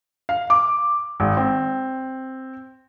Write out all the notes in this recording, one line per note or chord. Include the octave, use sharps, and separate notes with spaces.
F5
D6
G#1
C4